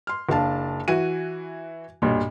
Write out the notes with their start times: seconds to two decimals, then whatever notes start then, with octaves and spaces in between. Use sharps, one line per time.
0.07 C6 F6
0.29 F#1 D4 F5 A5
0.88 E3 F#4 D#7
2.02 B1 G2 A#2